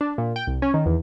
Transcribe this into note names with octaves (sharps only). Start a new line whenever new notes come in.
D4
A#2
G5
C2
C#4
D#3
E2